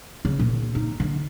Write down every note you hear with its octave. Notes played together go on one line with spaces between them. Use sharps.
C#3
A#2
D#4
D3